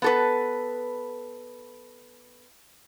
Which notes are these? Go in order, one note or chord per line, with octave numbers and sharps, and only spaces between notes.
B3 A4 B4